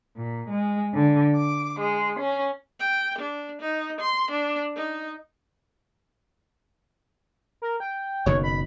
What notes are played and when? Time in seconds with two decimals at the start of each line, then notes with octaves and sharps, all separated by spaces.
0.16 A#2
0.49 G#3
0.93 D3
1.36 D6
1.79 G#3
2.19 C#4
2.79 G5
3.18 D4
3.61 D#4
4.00 C6
4.31 D4
4.76 D#4
7.62 A#4
7.80 G5
8.26 F#1 B2 D#3 C#5
8.43 B5